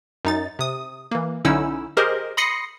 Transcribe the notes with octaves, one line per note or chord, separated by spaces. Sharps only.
F#2 D#4 A6
C3 D#6
E3 A#3
B1 D3 C#4 D#4 E4 E6
G4 G#4 A#4 C5 D#5
B5 C6 D#6 A#6 C7 C#7